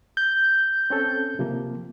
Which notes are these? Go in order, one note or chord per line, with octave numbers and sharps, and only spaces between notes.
G6
C4 C#4 A4
C3 F3 A#3